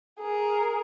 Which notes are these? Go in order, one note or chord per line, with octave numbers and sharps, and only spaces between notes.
G#4 A#4